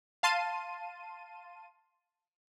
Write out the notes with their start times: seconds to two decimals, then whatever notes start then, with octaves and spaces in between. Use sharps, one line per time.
0.23 F5 A5 C6 D#7